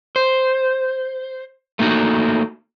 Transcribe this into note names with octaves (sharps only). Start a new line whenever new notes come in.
C5
A3 A#3 D#4 F4 F#4